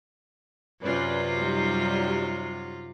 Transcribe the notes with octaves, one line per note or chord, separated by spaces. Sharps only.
F#2 C3 C#4 F4 B4 D5
F#3 G3 D#4